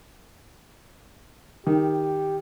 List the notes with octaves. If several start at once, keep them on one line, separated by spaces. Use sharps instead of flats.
D#3 G4